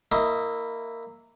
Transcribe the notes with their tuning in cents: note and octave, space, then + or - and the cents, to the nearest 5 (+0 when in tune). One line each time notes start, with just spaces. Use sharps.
A#3 -15 E4 +0 D#5 +10